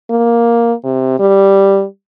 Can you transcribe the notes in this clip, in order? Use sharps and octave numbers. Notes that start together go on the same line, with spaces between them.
A#3
C3
G3